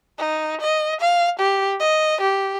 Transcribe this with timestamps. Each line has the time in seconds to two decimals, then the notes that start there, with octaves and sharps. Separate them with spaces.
0.18 D#4
0.61 D#5
1.00 F5
1.39 G4
1.80 D#5
2.21 G4